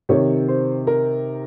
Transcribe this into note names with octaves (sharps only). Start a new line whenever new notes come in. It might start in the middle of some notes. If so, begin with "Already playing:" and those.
C3 D#3 C#5
C5
A#4